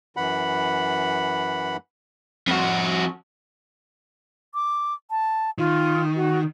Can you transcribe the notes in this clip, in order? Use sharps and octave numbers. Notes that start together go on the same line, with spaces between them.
F#2 E3 F#5 B5
F2 F#4
D6
A5
D#3 F4
F#4